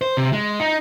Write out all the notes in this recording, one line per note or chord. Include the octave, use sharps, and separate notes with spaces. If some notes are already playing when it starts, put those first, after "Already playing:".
C5
C3
G#3
D#4